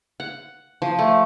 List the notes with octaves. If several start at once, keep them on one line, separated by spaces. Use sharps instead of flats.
F#5
F3
A3